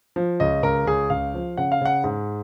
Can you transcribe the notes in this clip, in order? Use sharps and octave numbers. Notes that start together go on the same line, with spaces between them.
F3
C#2 D#5
C#2 A#4
C#2 G#4
C#2 F5
F3
C#3 F#5
F5
C#3 F#5
G#2